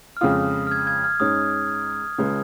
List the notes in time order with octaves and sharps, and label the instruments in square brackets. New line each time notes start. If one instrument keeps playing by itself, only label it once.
[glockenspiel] F6
[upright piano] F2 C#3 G#3 F4 [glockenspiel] D#6
[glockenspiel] F6
G#6
G#6
F6
[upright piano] G#2 G#3 C#4 [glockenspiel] D#6
[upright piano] C#2 C#3 G#3